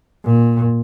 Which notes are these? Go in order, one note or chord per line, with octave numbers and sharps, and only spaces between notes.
A#2